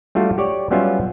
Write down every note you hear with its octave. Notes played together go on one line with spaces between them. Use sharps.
G3 A3 D4 F4 F#4
G4 C#5 D5
F#3 G3 B3 C#4 F4 E5